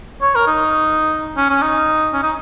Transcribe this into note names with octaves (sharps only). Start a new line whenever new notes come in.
C#5
A#4
D#4
C#4
C#4
D#4
C#4
D#4